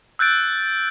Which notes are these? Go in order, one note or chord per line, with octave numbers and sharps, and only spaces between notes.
E6 F#6 G6 A6 D7